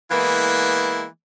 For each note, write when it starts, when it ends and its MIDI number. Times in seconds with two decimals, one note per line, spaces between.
0.11 1.05 52
0.11 1.05 56
0.11 1.05 58
0.11 1.05 59
0.11 1.05 64